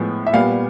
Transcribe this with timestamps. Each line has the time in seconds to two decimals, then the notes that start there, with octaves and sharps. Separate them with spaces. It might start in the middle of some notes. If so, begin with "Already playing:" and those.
Already playing: A2 F3 G#3 B3
0.27 E5
0.33 A#2 G3 B3 F5